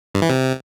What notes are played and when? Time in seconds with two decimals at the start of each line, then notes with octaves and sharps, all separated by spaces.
0.15 G2
0.22 E3
0.29 C3